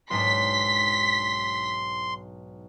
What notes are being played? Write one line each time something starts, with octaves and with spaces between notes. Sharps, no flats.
B1 G#2 D4 C6 B6